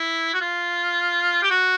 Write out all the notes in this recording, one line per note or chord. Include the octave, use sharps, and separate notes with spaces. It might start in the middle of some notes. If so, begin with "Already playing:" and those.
Already playing: E4
F#4
F4
G4
F#4